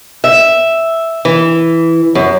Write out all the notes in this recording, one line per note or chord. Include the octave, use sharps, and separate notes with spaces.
E5
E3
F#2